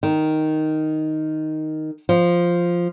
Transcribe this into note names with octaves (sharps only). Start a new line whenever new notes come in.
D#3
F3